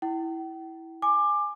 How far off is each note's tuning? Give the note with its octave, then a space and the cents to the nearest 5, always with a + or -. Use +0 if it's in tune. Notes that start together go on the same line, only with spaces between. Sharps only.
E4 -10 G5 -40
G#5 +0 D6 +20